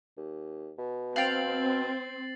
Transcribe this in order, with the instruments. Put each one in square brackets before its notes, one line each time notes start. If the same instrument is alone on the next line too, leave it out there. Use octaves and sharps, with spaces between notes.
[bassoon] D#2
B2
[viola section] C4 [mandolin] F5 G5 [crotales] A6 C7 F#7